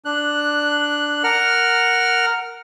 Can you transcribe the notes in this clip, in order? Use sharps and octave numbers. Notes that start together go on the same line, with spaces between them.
D4 F#6
A#4 F#5 F6